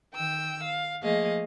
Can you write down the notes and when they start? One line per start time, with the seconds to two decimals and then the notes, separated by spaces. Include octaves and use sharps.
0.14 D#3 G5 E6
0.64 F5
1.02 F3 A3 A#3 G#4 D#5 F5